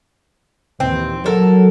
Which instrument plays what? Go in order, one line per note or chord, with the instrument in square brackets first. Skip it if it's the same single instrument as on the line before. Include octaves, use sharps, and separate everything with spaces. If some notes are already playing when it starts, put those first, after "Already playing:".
[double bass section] D#2 A#2 E3 [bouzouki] C4
[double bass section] F#3 [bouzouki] A4 A#4